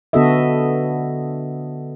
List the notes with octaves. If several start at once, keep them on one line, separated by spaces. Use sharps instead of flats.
D3 B3 F#4 A4 D#5 E5